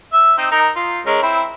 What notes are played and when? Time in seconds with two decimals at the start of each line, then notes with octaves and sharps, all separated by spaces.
0.13 E5
0.38 C4 D#4
0.51 D#4 A#4
0.76 F4
1.06 G#3 C#4 A#4
1.22 C4 E4 B5